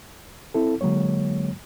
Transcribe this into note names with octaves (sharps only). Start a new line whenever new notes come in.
C4 E4 A4
D3 F#3 G#3 A#3 C#5